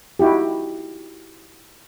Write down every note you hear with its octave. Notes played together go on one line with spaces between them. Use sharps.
D#4 E4 F#4 G4